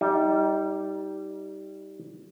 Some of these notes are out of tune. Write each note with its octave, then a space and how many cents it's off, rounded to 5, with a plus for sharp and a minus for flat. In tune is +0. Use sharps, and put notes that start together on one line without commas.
G3 -10 D#4 +25